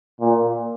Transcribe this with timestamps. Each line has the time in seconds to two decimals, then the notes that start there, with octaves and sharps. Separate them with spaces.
0.20 A#2